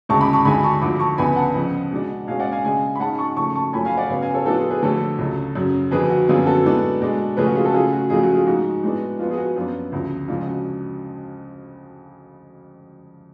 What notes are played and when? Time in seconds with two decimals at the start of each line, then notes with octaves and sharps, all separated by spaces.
0.09 D2 C#3 G#3 A5 C#6
0.21 B5 D6
0.33 A5 C#6
0.45 D2 D3 G#3 D4 G#5 B5
0.64 A5 C#6
0.82 D2 D3 F3 B5 D6
1.00 A5 C#6
1.18 D2 C#3 F3 B3 D4 G#5 B5
1.36 F#5 A5
1.55 F2 C#3 F3
1.91 B2 G#3 D4
2.27 B2 G#3 C#4 F5 G#5
2.40 D5 F#5
2.52 F5 G#5
2.63 C#3 G#3 D4 F5 G#5
2.96 B5
3.00 G#2 G#3 C#4 F#5 A5
3.18 A5 C#6
3.36 C#3 F3 A3 A5 C#6
3.55 A5 C#6
3.73 F#2 F3 A3 C#4 G#5 B5
3.85 F5 G#5
3.98 D5 F#5
4.09 C#3 F#3 B3 C#5 F5
4.21 F5 G#5
4.34 A4 C#5
4.45 A2 F3 B3 D4 F#4 A4
4.58 F4 G#4
4.70 G#4 B4
4.82 F2 D3 F#3 A3 A4 C#5
5.18 C#2 C#3 F#3
5.55 F#2 C#3 F#3
5.91 F2 D3 F#3 G#4 B4
6.10 F#4
6.28 F#2 D3 F3 B3 F4 G#4
6.46 F#4 A4
6.65 A2 G#3 B3 D4
7.01 B2 G#3 D4
7.37 C#3 F3 A3 C#4 G#4 B4
7.47 F#4
7.55 F4 G#4
7.65 F#4 A4
7.73 C#3 F#3 A3 F4 G#4
7.93 F#4
8.10 F2 C#3 F#3 A3 F4 G#4
8.23 F#4
8.34 F4 G#4
8.46 G#2 F3 G#3 F#4
8.83 A2 G#3 B3 D4
9.19 F2 F3 B3 F4
9.30 G#4
9.37 F#4
9.56 F#2 F3 B3 D4 F4
9.92 D2 C#3 F3
10.28 F2 C#3 G#3 D4 F4
10.47 F#4